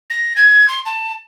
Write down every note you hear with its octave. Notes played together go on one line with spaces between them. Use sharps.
A#6
G#6
C6
A5